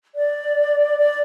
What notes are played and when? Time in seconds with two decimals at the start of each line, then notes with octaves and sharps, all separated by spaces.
0.15 D5
0.98 D5